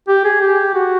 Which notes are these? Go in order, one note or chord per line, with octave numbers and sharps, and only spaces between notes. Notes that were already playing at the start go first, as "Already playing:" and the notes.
G4
G#4
G4
F#4